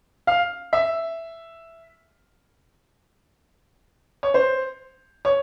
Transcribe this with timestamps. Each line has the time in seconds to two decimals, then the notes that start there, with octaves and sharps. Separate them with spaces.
0.27 F5
0.73 E5
4.23 C#5
4.34 C5
5.25 C#5